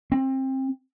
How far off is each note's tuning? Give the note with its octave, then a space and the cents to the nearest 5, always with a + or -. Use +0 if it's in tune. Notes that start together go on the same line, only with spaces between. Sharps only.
C4 +25